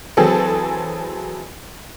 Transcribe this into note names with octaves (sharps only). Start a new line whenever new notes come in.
E3 F#3 C4 G#4 A4